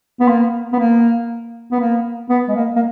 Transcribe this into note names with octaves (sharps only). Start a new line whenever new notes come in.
B3
A#3
B3
A#3
B3
A#3
B3
G#3
A#3
A#3